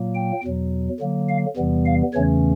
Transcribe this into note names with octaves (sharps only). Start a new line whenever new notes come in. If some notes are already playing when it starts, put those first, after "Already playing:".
Already playing: A#2 F#3 A#3
G5
E2 B2 F#3
D3 F#3 A#3
F5
E2 C3 E3 G3 B3
F5
E2 C#3 E3 A3 C#4 C#5